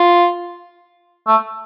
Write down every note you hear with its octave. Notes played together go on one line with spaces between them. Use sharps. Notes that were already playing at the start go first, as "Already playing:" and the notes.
Already playing: F4
A3